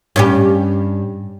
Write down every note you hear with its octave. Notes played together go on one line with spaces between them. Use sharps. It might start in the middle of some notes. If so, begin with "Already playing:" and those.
G2 C#4 G4